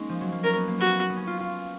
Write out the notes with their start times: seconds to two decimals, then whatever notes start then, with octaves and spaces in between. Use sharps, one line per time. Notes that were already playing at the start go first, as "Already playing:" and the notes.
Already playing: G#3 A#3 C#4 D#4
0.09 F3
0.21 F#3
0.32 A#3
0.44 C#4 A#4
0.56 B3
0.68 A#3
0.79 B3 F#4
1.10 B3
1.16 C#4
1.27 F4
1.40 F4